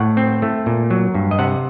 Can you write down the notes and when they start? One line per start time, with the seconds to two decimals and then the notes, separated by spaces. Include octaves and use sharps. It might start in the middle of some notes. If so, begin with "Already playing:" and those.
Already playing: A2 F#5
0.17 C4
0.42 A3
0.66 A#2
0.90 F#3
1.14 G2
1.31 D#5
1.39 C3 F#5